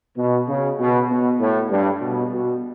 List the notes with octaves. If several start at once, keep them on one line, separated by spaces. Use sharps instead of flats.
B2
C#3
B2
B2
A2
G2
B2
B2